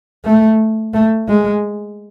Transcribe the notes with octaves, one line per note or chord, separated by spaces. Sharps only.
A3
A3
G#3